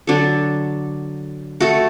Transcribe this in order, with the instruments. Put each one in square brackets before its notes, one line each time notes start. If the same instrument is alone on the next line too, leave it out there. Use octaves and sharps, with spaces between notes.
[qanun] D3 F#3 D4 A4
A3 F#4 A4